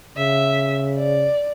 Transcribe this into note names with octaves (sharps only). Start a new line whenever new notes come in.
C#3 E5
D5